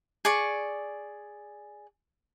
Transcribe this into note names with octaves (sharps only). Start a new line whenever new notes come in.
G#4 D5 C#6